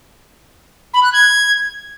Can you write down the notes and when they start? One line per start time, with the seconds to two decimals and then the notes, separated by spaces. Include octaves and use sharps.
0.94 B5
1.03 F#6
1.13 G#6